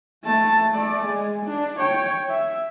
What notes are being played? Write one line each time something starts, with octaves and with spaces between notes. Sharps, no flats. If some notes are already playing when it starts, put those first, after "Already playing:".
A3 A5
A3 D5
G#3
D4
C#5 G5
E5